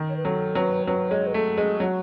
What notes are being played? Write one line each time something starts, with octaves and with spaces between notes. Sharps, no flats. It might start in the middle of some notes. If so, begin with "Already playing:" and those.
Already playing: D#3
C#5
B4
F#3 A4
F#3 B4
F#3 B4
G#3 C#5
B4
A3 A4
G#3 G#4
F#3 F#4